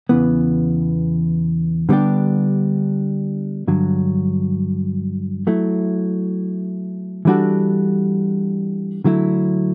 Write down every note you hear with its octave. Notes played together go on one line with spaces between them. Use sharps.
E2 C#3 E3 B3
D3 G3 B3 D4 G4
G2 D3 F#3
F#3 A3 E4
E3 G3 D4 F#4 A4
D3 F#3 A3 E4